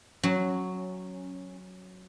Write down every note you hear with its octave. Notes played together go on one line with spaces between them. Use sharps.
F#3 C#4